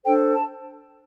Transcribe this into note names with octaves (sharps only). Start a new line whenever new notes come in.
D4 A4 C5 G5
A5